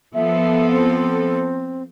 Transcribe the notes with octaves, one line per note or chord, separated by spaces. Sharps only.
F3 B3 A4 E5
C4